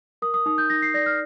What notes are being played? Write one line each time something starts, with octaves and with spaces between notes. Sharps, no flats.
A#4 D#6
D#6
D#4 D#6
G6
D#4 A#6
C7
D5 A#6
F6